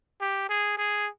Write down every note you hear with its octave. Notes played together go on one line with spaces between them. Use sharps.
G4
G#4
G#4